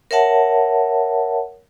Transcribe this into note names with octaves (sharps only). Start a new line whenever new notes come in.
A#4 C#5 E5 F#5 A5